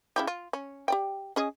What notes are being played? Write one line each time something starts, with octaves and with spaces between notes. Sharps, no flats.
C#3 E4 G4
F4
C#4
G4 D5 G5
C#4 G#4 D#5